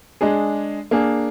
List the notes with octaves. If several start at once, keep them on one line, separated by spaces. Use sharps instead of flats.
G#3 D4 G#4
A#3 D4 G#4